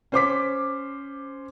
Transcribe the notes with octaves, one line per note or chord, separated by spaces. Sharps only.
C#4 C5 D6 B6